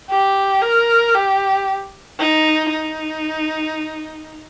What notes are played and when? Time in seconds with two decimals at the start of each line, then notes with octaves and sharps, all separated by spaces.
0.10 G4
0.62 A#4
1.15 G4
2.19 D#4
2.71 D#4